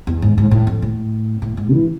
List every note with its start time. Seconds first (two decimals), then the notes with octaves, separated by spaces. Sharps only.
0.07 E2
0.22 G#2
0.38 G#2
0.51 A2
0.67 F2
0.82 A2
1.42 A2
1.57 G#2
1.72 E3